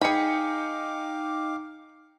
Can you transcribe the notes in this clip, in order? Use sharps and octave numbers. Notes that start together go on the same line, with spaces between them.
D#4 G#4 F5 G5 B5 D6 C#7